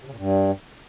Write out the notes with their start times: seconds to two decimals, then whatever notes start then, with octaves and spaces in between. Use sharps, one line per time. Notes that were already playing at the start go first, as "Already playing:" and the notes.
0.02 C3
0.07 C#3
0.12 A#2
0.17 G2